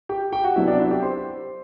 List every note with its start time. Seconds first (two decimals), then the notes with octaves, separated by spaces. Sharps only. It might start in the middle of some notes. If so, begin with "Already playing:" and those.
0.09 G4 G5
0.32 G4 G5
0.44 F#4 F#5
0.56 C3 F#3 B3 D4 E4 E5
0.68 D4 D5
0.79 E4 E5
0.91 G4 G5
1.02 C5 C6